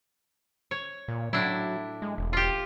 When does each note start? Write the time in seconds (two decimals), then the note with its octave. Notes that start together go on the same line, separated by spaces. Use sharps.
0.71 C#5
1.08 A#2
1.33 A2 F#3 D4 E4
2.02 G#3
2.18 E1
2.33 F4 G4